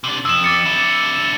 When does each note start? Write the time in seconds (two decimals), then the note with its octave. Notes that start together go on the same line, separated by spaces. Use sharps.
0.04 C3 D4
0.25 F2 E6 E7
0.44 D6 A6 C#7
0.66 D4 E4